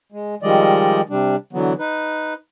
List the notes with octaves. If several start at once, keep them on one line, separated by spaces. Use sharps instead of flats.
G#3
D#3 F3 G3 G#3 D5 D#5
C3 G3 D4
D3 E3 F#3 B3
D#4 B4